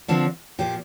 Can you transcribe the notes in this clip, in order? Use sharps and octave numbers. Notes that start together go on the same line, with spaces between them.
D3 F3 C4 D4
A#2 F3 A#3 G4